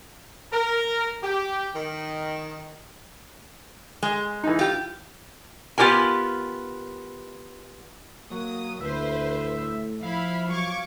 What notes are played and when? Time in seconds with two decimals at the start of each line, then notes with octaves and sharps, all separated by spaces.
0.52 A#4
1.23 G4
1.75 D#3
4.03 G#3
4.43 E3 D#4
4.59 F4 G4
5.78 B3 F4 G4 A#4 G#5
8.31 F#3 A#3 D#6
8.81 D2 A2 B4 C5 E5
10.03 F3 E4 E5 F5 B5
10.50 F#3 C#6 D6 G#6